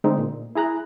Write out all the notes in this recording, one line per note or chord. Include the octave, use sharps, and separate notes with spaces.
D3 G#3 C4 D#4 G#4
A#2
E4 G#4 A#5 F#6